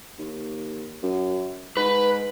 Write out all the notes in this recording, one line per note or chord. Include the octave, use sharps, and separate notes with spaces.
D#2
F#2
G#2 B4